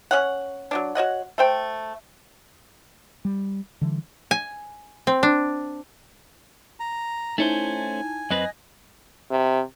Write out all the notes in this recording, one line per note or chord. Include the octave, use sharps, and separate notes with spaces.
C#4 C#5 F#5
F#3 G3 D4
F#4 C#5 D#5 F#5
A3 C5 G5
G3
D3 E3 G3
G#5
C4
D4
A#5
A3 C#4 D#4 E4 C5 G#5 A5
F#2 C4 B4 D#5 F#6 A#6
C3